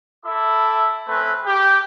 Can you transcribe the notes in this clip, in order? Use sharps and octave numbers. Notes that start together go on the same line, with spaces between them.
E4 A4 E5 D6
A3 C4 C#4 B4
G4